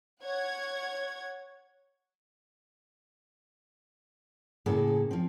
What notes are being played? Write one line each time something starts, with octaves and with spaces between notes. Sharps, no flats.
C#5 F#5 G#6
A2 C#3 A#3 G#4 A4
F3 C4